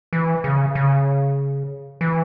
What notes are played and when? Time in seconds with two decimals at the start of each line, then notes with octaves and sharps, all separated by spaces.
0.13 E3
0.44 C#3
0.75 C#3
2.01 E3